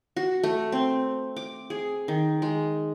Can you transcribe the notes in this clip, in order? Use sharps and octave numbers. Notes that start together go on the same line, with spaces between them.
F#4
A3
C4
D6
G#4
D#3
G#3